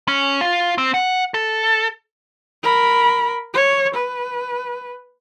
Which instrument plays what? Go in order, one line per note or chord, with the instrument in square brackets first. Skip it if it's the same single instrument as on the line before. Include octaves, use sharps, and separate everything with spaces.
[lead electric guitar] C#4
F4
C4
F#5
A4
[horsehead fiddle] A#4 B5
C#5
B4